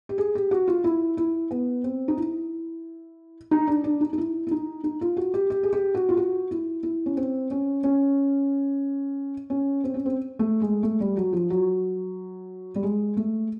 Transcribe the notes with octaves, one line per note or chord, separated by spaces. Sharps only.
G4
G#4
G4
F#4
F4
E4
E4
B3
C4
D#4
E4
D#4
D4
D4
D#4
D#4
E4
E4
D#4
D#4
F4
F#4
G4
G4
G#4
G4
F#4
F4
F#4
E4
E4
C#4
C4
C#4
C#4
C#4
C4
C#4
C4
A3
G#3
A3
G3
F#3
F3
F#3
G3
G#3
A3